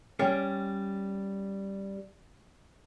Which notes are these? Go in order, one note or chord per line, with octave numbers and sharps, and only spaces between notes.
G3 C#4 D5 G5